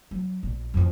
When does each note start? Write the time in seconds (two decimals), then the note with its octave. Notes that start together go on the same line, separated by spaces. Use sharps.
0.11 F#3
0.43 A#1
0.74 F2 E3